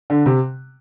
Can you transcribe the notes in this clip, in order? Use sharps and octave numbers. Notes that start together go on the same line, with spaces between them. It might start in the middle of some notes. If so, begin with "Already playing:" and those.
D3
C3